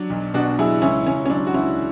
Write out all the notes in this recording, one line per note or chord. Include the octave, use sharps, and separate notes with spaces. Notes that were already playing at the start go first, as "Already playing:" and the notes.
Already playing: F#3 D4
B1
B2 D4 F#4
F#3 E4 G#4
C#2 C#4 E4
C#2 C#4
C#4
F#3 D4
F#4
C#2 C#4 E4